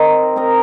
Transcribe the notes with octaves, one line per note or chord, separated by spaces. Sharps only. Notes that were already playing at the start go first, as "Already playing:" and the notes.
Already playing: C4 D#4 A#4 D#5
C4 D#4 A#4 D#5